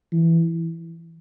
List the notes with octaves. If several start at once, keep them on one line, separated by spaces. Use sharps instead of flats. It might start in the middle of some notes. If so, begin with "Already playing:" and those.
E3